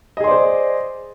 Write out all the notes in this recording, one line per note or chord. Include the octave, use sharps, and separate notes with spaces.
G#4 C5 D5 D#5 C6